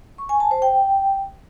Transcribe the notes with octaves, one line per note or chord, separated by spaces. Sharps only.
C#6
G#5
A5
C5
G5